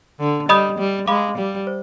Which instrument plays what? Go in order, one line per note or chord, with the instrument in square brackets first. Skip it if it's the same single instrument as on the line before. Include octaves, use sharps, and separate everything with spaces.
[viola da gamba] D3
[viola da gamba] G3 [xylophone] D#5 B5 D#6 G6
[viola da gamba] G3
[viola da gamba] G#3 [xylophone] F5 B5 D6
[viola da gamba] G3
[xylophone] C5